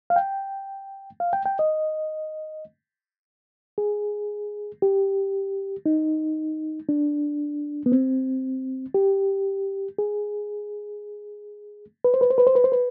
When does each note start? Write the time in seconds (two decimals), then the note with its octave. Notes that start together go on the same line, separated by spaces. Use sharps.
0.10 F5
0.16 G5
1.20 F5
1.33 G5
1.46 G5
1.59 D#5
3.78 G#4
4.82 G4
5.86 D#4
6.89 D4
7.86 B3
7.92 C4
8.94 G4
9.98 G#4
12.04 B4
12.14 C5
12.21 B4
12.30 C5
12.38 B4
12.47 C5
12.55 B4
12.64 C5
12.72 B4